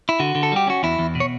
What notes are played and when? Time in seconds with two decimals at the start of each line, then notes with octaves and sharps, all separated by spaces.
0.09 E4
0.20 D3 F#4
0.35 D3
0.43 A4
0.52 G3 G4
0.67 C#4 F#4
0.83 E2 E4
0.99 E2
1.15 B2
1.20 C#5